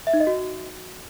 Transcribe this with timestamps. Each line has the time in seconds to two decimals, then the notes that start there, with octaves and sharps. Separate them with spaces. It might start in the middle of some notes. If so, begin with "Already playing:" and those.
0.07 E5
0.14 D#4
0.20 D#5
0.27 F#4